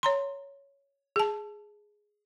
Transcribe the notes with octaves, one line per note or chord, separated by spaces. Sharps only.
C#5 A#5 C6
G#4 A5